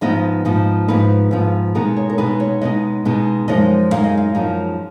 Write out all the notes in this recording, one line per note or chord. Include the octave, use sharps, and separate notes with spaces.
G#2 F3 B3 D#4 D#5
G#2 F3 B3 D#4
G#2 F3 B3 D#4 B4
G#2 F3 B3 D#4
B2 G#3 B3 D#4 A#4
C#5
A#4
B2 G#3 B3 D#4 B4
C#5
B2 G#3 B3 D#4 D#5
B2 G#3 B3 D#4
F#2 F3 G#3 D#4 D#5
F#2 F3 G#3 D#4 F5
D#5
F5
F#2 F3 G#3 D#4